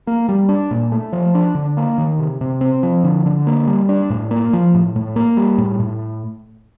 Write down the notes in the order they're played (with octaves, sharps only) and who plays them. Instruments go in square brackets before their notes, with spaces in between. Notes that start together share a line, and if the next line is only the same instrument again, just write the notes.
[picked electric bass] A#3
G3
D4
A#2
A3
F3
D4
D3
A#3
D#3
C3
C3
C4
F3
D3
D3
A#3
G3
D4
A2
A#3
F3
A2
A2
A#3
G3
A2
A2